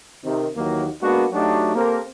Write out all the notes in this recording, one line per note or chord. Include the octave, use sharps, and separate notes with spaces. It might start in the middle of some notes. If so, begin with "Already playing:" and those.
C3 D#3
D#2 D#3 E3 F#3 A#3
G#3 A#3 B3 D4 F#4
F#3 A3 D4 D#4 F#4 G4
A#3 C4 G4 A4 A#4